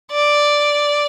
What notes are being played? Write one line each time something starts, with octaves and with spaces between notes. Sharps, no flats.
D5